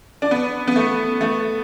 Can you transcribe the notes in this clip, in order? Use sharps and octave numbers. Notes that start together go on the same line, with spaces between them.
D4
B3
B3
A3
A3